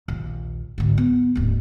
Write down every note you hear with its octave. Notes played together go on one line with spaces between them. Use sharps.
A#1 D#2
G#1 D2
B3
D1 G#2